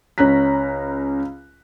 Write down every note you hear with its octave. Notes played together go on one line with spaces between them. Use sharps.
C#2 C#4 A#5 F#6 B6